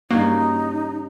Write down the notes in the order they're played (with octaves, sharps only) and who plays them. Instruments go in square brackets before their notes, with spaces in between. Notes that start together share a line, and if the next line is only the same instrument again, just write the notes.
[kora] G2 C#3 F#4 [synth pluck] A#3 [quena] D#4